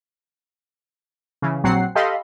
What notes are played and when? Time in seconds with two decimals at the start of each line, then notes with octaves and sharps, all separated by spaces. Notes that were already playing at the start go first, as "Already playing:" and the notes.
1.42 C#3 E3
1.63 A#1 F#3 C4 F#5 C7
1.95 G4 A4 D#5 F5 B5 C6